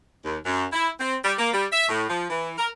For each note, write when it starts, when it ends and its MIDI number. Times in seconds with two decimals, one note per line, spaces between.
0.25 0.38 39
0.45 0.65 42
0.73 0.89 64
1.00 1.15 60
1.24 1.34 55
1.38 1.51 58
1.53 1.67 55
1.72 1.88 76
1.89 2.06 45
2.09 2.26 53
2.30 2.54 52
2.58 2.68 70